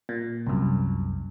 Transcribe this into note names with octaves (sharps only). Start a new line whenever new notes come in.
A#2
C2 F#2